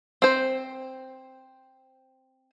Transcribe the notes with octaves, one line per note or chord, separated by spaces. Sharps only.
C4 C5